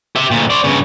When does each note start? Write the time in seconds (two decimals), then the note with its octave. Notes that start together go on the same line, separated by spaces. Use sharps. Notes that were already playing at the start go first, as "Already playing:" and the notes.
0.16 G4 E5
0.31 D2 A#2
0.50 C5 D5
0.64 G2 C#3